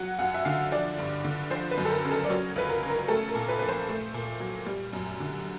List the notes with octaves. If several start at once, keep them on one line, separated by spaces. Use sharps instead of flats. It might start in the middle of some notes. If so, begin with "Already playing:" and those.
Already playing: F#3 F#5
F#2 F#5
E5
D3 F5
F3 D5
G2
D3
F3 C5
B4
F#2
A4
A#4
C#3
A4
D5
F#3 C#5
C#2 B4
A#4
C#3
A#4
A3 A4
A#4
A#2
B4
F3 B4
C5
A3
A#2
F#3
G3
F#2
D3